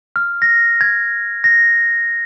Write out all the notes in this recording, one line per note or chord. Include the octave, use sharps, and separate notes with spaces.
F6
A#6
G#6
A#6